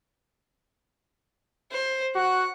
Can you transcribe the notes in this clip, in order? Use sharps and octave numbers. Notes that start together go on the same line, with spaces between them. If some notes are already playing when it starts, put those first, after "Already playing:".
C5
F#4 F#5